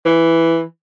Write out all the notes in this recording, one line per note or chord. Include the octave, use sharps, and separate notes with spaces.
E3